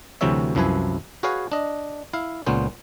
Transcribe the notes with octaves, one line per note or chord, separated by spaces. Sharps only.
D2 C3 E3 F#3 C#5 E5
C2 F#2 F3 E4 B4 G#5
F#4 G#4 B4 C#5 F5 G#5
D4 D#5
E4 F5
C#2 A#2 B3 C#4 C5